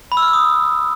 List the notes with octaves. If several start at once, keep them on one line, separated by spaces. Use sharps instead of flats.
B5
E6
F6
E6
D#6